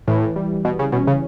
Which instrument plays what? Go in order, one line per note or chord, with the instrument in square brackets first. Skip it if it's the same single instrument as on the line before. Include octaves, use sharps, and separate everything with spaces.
[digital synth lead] A2 [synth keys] E3
[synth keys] G3
[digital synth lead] B2
C#3
[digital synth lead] B2 [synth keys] C#4
[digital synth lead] C#3